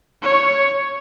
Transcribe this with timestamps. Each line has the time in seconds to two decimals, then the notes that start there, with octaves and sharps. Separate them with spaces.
0.22 C#5